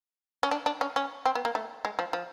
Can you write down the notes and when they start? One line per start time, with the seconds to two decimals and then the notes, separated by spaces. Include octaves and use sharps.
0.43 C#4
0.51 D4
0.66 D4
0.81 C#4
0.96 C#4
1.26 C4
1.35 B3
1.45 A#3
1.55 A3
1.85 G#3
1.99 F3
2.13 F3